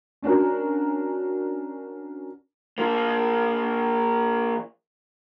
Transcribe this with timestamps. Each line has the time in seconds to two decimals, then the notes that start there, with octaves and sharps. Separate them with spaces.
0.22 C#4 D4 F#4 A#4
2.78 F3 A#3